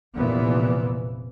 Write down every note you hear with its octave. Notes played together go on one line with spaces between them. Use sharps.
F1 A#2 E3 B3